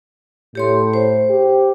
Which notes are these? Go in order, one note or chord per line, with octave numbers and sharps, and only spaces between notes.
A2 G4 C#5 C6
C5
G4